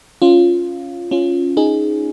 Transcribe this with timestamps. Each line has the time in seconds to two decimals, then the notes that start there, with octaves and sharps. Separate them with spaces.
0.22 C#4 F4
1.11 C#4 F4
1.57 D#4 G#4